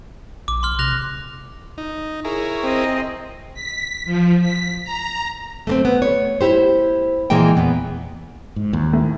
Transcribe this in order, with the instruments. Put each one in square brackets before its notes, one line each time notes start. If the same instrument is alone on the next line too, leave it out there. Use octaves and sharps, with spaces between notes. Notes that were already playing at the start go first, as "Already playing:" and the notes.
[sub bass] A#1 [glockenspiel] D6
[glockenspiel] C6 F6
[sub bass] C3 [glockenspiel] F#6 A#6 F7
[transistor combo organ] D#4
[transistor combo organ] E4 G#4 A#4 [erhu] C#5
[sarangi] C4 [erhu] D#5
[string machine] B6
F3
B6
A#5
[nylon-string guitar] A3 A#3 C4
B3
C#5
E4 G4 C5
A#2 E3 G#3 A#3 G5
E2 B3
[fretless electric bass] G#2
D#2
[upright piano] A2